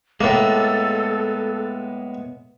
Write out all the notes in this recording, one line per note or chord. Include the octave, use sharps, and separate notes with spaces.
A2 G#3 A#3 B3 A4